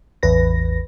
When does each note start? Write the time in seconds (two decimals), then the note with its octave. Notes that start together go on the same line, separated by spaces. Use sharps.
0.23 A1 E2 B4 A#6